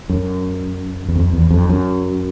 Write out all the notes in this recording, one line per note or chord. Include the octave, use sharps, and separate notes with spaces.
F#2
E2
F2
E2
F2
F#2